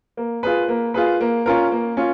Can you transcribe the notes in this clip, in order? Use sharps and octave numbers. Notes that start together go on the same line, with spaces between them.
A#3
F4 G#4 B4
A#3
F4 G#4 B4
A#3
C#4 F4 A#4
A#3
C#4 F4